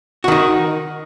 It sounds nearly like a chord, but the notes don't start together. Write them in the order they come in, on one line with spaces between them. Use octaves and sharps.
F#4 D#3 D#4